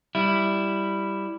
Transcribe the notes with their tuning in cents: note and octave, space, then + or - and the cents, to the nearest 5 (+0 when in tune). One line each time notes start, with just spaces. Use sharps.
G3 +0 E4 +0